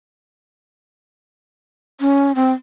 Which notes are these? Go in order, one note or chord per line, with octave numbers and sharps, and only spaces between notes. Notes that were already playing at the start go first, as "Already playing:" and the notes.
C#4
C4